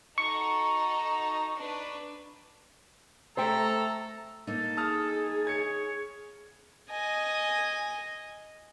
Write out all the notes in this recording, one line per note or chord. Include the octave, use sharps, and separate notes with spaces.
D#4 F#4 A4 C#6
D4 B4
A3 A4 C5 E5 G5 A#5
A#3 D#4 A4
G#4 A5 D#6 F6
C#5 G#6 C#7
D#5 G#5